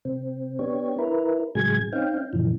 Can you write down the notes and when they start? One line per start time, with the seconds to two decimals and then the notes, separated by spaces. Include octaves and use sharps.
0.05 C3 C4
0.59 B3 D4 G4 C#5
0.99 E4 A#4 B4
1.55 A2 C#3 F#3 G#3 G#5 G#6
1.93 C4 C#4 D#4 F5 G5
2.33 F#2 A#2 C#3 E3 F3